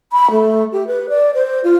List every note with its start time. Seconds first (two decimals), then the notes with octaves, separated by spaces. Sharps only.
0.12 B5
0.30 A3
0.72 G4
0.87 B4
1.09 D5
1.34 C5
1.63 F4